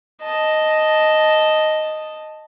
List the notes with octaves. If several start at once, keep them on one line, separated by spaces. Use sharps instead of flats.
D#5 A5